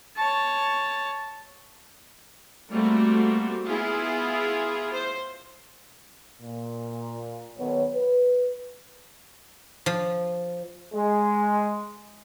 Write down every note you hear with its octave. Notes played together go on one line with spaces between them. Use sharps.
C#5 A5
G3 A3 A#3 C4 F#4
B3 E4 F4 G#4
C5
A#2
B1 D#3 B3 C#5
B4
F3
G#3